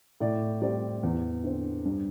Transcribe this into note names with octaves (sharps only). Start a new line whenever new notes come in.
A2 D5
G3 C4 D5
E2
D3 C4
G2